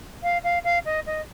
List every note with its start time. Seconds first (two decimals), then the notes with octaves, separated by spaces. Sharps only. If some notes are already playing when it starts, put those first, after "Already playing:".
0.23 F5
0.43 F5
0.64 F5
0.85 D#5
1.06 D#5